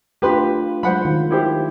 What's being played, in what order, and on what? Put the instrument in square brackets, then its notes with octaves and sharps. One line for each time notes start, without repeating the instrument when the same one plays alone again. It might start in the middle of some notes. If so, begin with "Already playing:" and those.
[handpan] A3 D4 F4 [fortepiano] G4 B4 C6
[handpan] F#3 G#3 [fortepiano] C5 F#5 B5
[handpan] D#3 F4
[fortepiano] E4 G4 C5